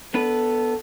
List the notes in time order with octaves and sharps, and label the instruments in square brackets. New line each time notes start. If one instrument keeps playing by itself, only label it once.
[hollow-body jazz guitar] B3 D4 B4 [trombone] A4